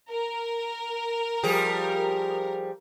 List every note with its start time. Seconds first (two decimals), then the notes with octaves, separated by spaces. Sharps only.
0.10 A#4
1.43 F3 G3 G#4